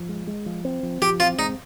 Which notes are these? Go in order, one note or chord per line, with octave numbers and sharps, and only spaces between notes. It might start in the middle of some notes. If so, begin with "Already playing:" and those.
Already playing: F3
G#3
G#3
F3
C4
F3
F3 G4
C4 F4
G#3 D#4